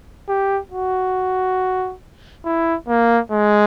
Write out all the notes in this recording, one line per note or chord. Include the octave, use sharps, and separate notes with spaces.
G4
F#4
E4
A#3
G#3